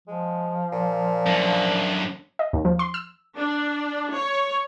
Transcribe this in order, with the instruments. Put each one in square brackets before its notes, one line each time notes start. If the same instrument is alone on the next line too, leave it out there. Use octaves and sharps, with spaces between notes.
[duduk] F3 [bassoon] G#3
[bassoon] A#2
[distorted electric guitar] F#2 D3
[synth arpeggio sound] D#5
D#2
F3
C6
E6
[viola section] D4
C#5